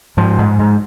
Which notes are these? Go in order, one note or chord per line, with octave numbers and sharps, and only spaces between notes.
G#2 F3
G#2
G#2